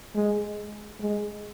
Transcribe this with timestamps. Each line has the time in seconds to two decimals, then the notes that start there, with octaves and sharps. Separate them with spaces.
0.15 G#3
1.01 G#3